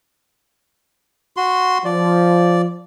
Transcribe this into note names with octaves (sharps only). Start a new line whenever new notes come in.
F#4 C6
F3 D5